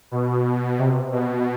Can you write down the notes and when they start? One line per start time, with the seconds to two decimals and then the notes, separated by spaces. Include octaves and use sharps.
0.11 B2
0.79 C3
1.12 B2